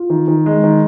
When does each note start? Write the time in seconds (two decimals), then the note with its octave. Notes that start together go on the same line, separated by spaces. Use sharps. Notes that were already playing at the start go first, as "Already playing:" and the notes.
Already playing: F4
0.10 D#3
0.28 D#3
0.46 G#3
0.64 D#3